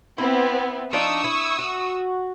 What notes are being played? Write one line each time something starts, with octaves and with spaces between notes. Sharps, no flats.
B3 C4 E4
F3 D4 D#4 C#6 D#6 E6
E4
F#4